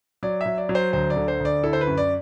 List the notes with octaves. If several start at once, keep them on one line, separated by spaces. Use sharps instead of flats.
F#3 D5
E5
F#3
D5
F#3
C5
D2 C5
D5
D3
C5
D2
D5
E4 A4
C5
B4
F#2
D5